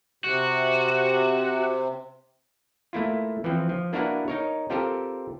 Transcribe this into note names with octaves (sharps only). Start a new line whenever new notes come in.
C3 F#4
A3 A#3 E4 F4
E3 F3 C4
F3
A#3 D4 E4 F#4 A#4 B4
D#4 A#4 C#5
C4 F4 G4 A4 A#4